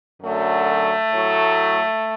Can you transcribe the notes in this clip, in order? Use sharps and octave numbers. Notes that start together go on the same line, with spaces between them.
F#2 D3 F#3 A3
A2
F#3